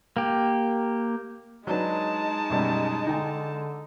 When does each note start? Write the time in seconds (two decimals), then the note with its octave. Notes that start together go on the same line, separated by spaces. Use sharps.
0.17 A#3 G4
1.67 F#3 G#3 D4 D#4 B4 A5
2.50 F#2 B2 G3
3.07 D3 D#4 G5 G#5